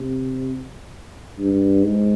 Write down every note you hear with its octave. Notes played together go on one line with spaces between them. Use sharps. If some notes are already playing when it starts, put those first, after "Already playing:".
Already playing: C3
G2
G#2